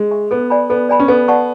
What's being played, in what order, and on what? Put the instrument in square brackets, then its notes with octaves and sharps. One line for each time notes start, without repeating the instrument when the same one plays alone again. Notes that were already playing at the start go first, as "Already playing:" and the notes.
Already playing: [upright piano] G#3
[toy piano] E5 G#5 C#6
[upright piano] B3 [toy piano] A4
[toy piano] D5 G#5 B5
[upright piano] B3 [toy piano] A4
[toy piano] D5 G#5 B5
[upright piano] C#4
[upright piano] B3 [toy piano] A4
[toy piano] D5 F#5 A5 C#6